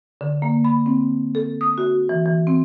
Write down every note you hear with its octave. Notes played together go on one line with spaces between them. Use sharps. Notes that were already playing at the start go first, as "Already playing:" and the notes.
D3
A#3
B5
C4
A4
D#6
F#4
E3
E3
C4